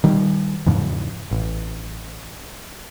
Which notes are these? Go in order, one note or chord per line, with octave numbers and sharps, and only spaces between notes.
D#3 G3
E2 G#2 C#3 F3
A1